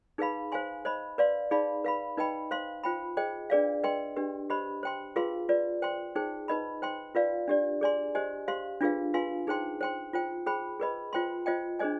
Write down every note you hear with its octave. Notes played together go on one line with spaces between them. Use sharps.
D#4 G#4 B4 F5 B5
C5 F5 G#5 C6
C5 D#5 B5
B4 D5 F5 C6
D#4 G#4 D5 F5 B5
B4 F5 B5
D#4 B4 D#5 G5 B5
C5 F5 C6
F4 C5 G5 B5
G#4 C5 D#5 G5
D4 G#4 B4 D5 F5
B4 D#5 G5 C6
D4 G4 B4
G4 C5 D#5 B5
C5 G5 C6
F4 G#4 B4 F5 C6
F4 B4 D5
C5 G5 C6
D#4 G#4 C5 G5
D#4 B4 D#5 B5
C5 G5 C6
F4 B4 D5 F5
D4 G4 D5
G#4 D5 G#5 C6
G4 C5 D#5 G#5
G4 C5 F5 C6
D4 F4 G#4 B4 F5
F4 B4 F5 G#5 C6
D#4 G#4 C5 G5 C6
C5 G5 C6
F4 C5 G5
G#4 C5 G5 B5
G#4 B4 D#5 B5
F4 C5 G5 C6
F4 C5 D#5 G5
D4 G#4 C5 D#5 G#5